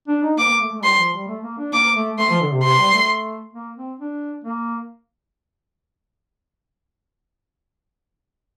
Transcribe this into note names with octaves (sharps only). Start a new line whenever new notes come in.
D4
D#4
A#3 D6
A#3
A3
A3
G3 C6
F3
G3
A3
A#3
D4
A#3 D6
A3
A3 C6
F3
D3
C3
C3 C6
G3
A3
A#3
C4
D4
A#3